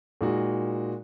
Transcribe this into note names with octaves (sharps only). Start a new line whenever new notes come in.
A#2 G#3 D#4 F#4